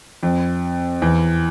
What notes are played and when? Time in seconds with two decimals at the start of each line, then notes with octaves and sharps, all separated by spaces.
0.23 F2
1.02 E2